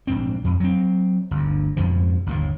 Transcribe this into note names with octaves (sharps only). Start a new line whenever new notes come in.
A#1 G#2 C4
F2
F#3 C4
G1 D2
F2 G#2 B2 F3
G1 D#2 A2